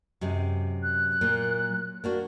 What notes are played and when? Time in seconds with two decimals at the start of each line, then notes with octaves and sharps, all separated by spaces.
0.21 F#2 C3 F#3 G#3
0.83 F#6
1.21 A#2 A#3
2.04 A#3 D4 F#4